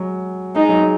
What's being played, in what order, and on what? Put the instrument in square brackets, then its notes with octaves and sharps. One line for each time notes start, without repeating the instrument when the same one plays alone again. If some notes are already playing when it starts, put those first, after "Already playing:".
Already playing: [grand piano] F#3 G#3
[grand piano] G#3 [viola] D#4
[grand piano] F#3
G#3